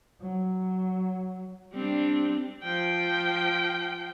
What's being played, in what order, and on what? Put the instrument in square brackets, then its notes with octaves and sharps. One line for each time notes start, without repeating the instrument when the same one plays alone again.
[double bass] F#3
[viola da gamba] G3 C4 D4
[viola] F3 G5